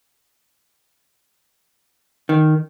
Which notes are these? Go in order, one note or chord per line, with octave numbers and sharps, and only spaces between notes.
D#3